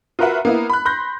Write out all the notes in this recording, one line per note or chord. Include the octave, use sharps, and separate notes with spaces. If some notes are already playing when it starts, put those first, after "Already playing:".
F4 F#4 A#4 B4 E5 F#5
A#3 B3 E4
B5 F#6
B5 C6 F#6 G6 A#6